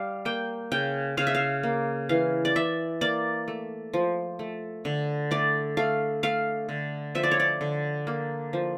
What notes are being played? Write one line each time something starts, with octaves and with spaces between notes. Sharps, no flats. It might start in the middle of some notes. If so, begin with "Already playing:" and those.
Already playing: G3 F5
A#3 G5
C#3 G5
C#3 F5
E5
F5
A#3
E3 F5
D5
E3 E5
A#3 D5
A3
F3
A3
D3
A3 D5
A3 F5
A3 F5
D3
F3 E5
D5
C#5
D5
D3
A#3
F3